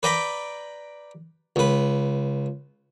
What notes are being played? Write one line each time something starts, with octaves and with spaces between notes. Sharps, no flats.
B4 D5 G5 A#5 B5
C#2 B4